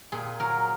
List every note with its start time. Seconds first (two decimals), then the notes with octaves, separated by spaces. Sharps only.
0.12 A#2 G#4
0.40 F#3 A#4